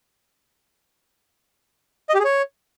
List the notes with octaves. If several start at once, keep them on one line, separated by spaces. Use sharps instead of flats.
D#5
G4
G#4
C#5